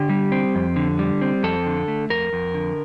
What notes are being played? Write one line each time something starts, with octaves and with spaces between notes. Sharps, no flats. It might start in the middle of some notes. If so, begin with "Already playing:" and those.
Already playing: D3 G4
G3
C4
F2
D3
G3
C4
F2 A4
D3
A3
F2 A#4
F2
D3